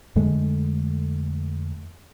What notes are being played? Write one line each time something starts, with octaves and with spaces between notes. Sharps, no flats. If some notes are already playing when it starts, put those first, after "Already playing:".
F2 D3 G#3 A3